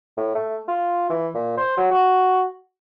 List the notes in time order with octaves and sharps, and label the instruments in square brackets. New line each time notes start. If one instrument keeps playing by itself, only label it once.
[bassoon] A2
A3
F4
E3
A#2
C5
F#3
F#4